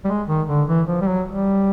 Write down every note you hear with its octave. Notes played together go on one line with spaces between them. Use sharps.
G3
G#3
D#3
D3
E3
F3
G3
F#3
G3